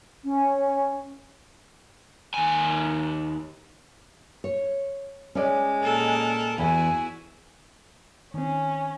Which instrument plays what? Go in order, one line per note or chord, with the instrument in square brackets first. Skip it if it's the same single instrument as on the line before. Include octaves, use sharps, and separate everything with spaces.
[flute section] C#4
[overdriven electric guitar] D#2 G#5
[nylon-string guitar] C#5
[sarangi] G#3 [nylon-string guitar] C#4 D5
[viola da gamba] A#2 A4 A#4
[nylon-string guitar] E2 [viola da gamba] E4 F#4 G#4 [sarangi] G#5
[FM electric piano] D#3 C4 [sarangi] C#4